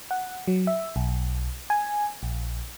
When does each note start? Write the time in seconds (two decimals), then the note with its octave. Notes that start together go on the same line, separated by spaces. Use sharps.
0.11 F#5
0.48 F#3
0.67 E5
0.96 B1
1.70 G#5
2.23 A#1